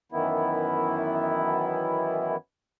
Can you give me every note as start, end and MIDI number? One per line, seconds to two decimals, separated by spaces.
0.12 2.36 42
0.12 2.36 51
0.12 2.36 52
0.12 2.36 59
0.12 2.36 64